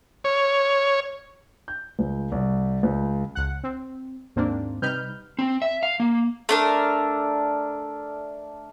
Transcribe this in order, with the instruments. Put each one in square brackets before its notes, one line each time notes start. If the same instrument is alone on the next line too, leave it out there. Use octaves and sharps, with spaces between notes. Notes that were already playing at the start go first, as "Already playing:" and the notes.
[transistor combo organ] C#5
[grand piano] G6
C#2
C2
C#2
[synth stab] C#2 F#5
C4
D#2 G#2 A#3 C4 D4
C3 G3 D#4 B4 F6 G6
[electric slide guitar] C4
E5
F5
A#3
[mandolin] A3 D4 A#4